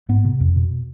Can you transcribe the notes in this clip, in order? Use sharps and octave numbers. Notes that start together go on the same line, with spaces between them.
G#2 B3
C3
F2
B2